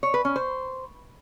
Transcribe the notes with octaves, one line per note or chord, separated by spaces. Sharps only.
C#5
B4
C#4
C5